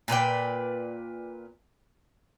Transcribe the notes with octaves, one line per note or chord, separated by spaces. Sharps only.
A#2 B4 D5 G5